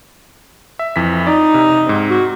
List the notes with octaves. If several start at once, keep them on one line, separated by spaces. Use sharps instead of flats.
E5
F2 E3 B6
D#4 D5
C3
G#2 C4
F#4